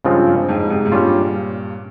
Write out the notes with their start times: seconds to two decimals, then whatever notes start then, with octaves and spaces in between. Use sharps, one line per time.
0.05 G2 C#3 F3 G#3 C4 F4
0.26 G2
0.48 F2 G#2
0.70 G#2 C3
0.85 G#2
0.91 G2 A#2 G3 C#4 F4